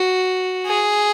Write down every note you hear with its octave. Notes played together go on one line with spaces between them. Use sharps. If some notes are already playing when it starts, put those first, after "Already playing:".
Already playing: F#4
G#4